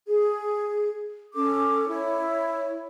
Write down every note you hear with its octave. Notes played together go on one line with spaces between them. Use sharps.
G#4
C#4 A4 D6
E4 C#5